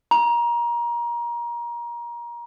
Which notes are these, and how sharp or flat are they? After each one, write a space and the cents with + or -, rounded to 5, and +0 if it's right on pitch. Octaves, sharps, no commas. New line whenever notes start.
A#5 +25